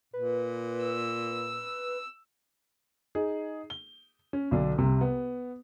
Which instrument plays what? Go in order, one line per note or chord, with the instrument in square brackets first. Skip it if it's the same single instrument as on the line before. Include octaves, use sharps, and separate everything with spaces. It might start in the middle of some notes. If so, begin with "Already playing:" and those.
[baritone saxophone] A#2 [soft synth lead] B4
[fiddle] E6
[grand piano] D#4 G#4
G7
C#4
B1 D3 D4
C2 C3
B3